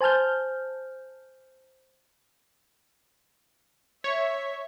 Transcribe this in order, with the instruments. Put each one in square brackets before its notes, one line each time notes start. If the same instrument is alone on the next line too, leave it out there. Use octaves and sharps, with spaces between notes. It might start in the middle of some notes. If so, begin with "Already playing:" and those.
[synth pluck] C5 G#5 A5 F6 G6
[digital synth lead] C#5 [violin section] E5